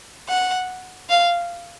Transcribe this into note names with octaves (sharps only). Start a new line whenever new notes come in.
F#5
F5